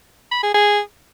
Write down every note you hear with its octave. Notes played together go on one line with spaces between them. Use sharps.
B5
G#4
G#4